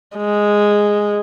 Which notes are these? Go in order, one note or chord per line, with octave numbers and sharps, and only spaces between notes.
G#3